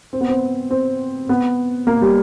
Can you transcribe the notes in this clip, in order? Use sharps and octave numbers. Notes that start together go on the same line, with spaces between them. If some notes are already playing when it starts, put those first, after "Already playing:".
C4
B3
C4
C4
B3
A#3
G3